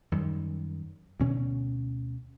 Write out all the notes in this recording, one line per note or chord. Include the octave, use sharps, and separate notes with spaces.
F#2 D#3 G3
D2 B2 D3 C#4